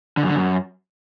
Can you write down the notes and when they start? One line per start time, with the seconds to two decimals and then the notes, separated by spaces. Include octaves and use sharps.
0.17 D3
0.23 F#2
0.29 D3
0.35 F#2